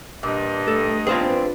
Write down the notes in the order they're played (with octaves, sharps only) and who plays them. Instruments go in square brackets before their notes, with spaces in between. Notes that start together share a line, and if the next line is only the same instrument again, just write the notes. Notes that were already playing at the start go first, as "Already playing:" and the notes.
[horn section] G2 D#5 [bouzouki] A#2
[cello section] A3 [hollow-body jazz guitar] A4
[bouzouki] C4 [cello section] D4 F4 B4 [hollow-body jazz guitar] G#4 C5 F5